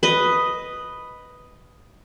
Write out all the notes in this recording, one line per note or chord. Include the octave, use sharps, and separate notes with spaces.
B4 D#5